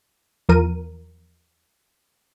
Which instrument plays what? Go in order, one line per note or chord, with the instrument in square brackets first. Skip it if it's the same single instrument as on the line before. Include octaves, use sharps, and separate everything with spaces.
[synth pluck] E2 F3 A#4 D#7